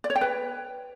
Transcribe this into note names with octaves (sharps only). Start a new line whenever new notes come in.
D5
C#5
G5
B4